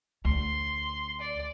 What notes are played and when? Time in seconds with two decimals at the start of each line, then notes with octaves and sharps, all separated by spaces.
0.25 D2 C6
1.21 D5